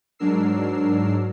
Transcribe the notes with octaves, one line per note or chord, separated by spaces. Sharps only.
G#2 F#3 D4 A#4 E6 C7